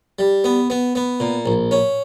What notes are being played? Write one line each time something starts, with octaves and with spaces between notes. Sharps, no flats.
G3
B3
B3
B3
A#2
A#1
C#4